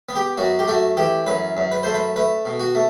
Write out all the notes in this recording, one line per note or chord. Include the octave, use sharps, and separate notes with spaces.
B3
G4
F#2 F#4
G4
A3 F#4
E3 G4
F#2 B4
F#2
B4
A3 C5
B4
A3 B4
B2
F#4
A3